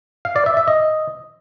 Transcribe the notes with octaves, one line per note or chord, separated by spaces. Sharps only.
F5
D5
E5
E5
D#5